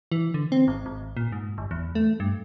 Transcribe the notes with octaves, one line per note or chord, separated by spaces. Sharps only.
E3
D3
C4
G#1
G#1
A#2
G#2
G1
E2
A3
G2